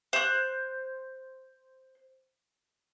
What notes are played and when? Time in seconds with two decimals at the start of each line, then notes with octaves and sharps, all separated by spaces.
0.13 C5 F#6